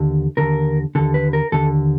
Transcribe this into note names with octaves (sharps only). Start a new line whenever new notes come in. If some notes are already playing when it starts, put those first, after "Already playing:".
Already playing: D#2 D3
D#2 D3 A#4
D#2 D3 A4
B4
A#4
D#2 D3 A4